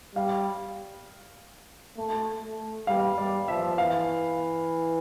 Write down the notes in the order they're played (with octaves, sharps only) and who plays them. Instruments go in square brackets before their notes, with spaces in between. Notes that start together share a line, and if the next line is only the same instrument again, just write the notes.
[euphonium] G3 [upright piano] F5
[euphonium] A3
A3
[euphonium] G3 [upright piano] F5
[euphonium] G3 [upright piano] D5
[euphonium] F3 [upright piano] E5
[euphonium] E3 [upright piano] F5